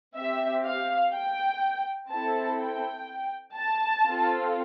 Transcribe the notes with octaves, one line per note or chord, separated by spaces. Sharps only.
C4 G4 E5
F5
G5
C4 E4 A4 A5
G5
A5
C4 F4 A4